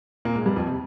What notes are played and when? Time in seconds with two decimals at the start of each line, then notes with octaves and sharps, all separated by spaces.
0.25 A#2 A#3
0.35 G#2 G#3
0.46 G2 G3
0.56 F2 F3
0.67 C3